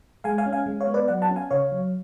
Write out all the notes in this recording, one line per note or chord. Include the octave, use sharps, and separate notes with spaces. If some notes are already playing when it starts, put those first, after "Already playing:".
G#3 F5 G#5
F5 G#5
C#4
F5 G#5
G#3
C#5 F5
B3
B4 D5
F#3 D5 F#5
F#5 A5
C#4
F5 G#5
C#3 C#5 F5
F#3